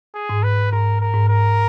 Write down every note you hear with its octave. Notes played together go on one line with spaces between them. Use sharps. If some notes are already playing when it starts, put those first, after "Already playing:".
G#4
G#2
B4
G#2 A#4
A#4
G#2
A#4